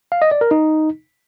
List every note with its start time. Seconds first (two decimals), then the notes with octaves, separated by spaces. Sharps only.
0.12 F5
0.22 D#5
0.31 D5
0.41 A#4
0.51 D#4